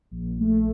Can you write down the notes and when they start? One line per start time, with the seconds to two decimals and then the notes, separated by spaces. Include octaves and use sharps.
0.11 A#1
0.40 A3